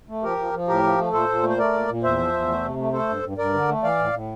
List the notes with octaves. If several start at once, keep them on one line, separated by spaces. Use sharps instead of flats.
A3
F3 G4 A#4
F3
F3
A2 G4 A#4
F3
A3
A#2 A4 C5
A#2
A3
C5
A3 A#4 D5
A#2
A#2
E2 C5 E5
F3
E2
A3
C3
A3
A3 A4 C5
G2
G2
G2 A#4 D5
D3
A3
E3 D5 F5
A2
A2